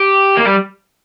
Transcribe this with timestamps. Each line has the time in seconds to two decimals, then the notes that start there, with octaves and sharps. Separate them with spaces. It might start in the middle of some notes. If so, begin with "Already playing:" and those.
Already playing: G4
0.37 A#3
0.46 G3